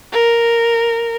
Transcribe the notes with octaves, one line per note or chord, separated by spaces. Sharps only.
A#4